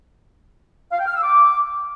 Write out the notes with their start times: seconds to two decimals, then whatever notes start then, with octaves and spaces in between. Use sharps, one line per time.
0.91 F5
0.99 G5
1.07 F6
1.15 E6
1.22 D6